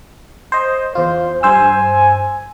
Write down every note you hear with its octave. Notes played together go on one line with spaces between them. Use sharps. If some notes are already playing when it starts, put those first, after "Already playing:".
C5 D#5
E2 F4 C5
G2 C5 G#5 E6